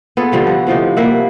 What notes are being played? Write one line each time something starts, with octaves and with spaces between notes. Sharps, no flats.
B3 F4 G#4 A4
G2 D3 F3 G3
F#4
A2 C3 F3 D#4
G3 A#3 E5 F#5